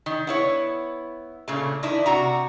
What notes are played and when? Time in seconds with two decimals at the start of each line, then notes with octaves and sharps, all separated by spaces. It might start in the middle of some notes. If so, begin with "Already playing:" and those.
0.06 D#3
0.27 B3 E4 C#5
1.48 A#2 C#3 A3
1.83 D#3 D4 E4
2.06 C3 F#4 A#5